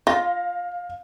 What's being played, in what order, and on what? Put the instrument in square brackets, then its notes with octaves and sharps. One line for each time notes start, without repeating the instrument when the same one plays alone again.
[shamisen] F4 [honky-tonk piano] F5 A#6